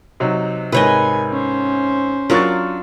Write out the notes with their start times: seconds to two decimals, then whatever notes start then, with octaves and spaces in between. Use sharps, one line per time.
0.20 C3 F#3 D#4
0.72 G#2 C3 A#4 B4 C#5 D#5 G#5
1.31 C#4 C5
2.30 F#3 D4 F4 A#4 C#6 A6